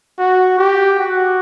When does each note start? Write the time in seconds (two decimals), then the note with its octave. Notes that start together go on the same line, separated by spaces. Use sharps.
0.19 F#4
0.59 G4
0.99 F#4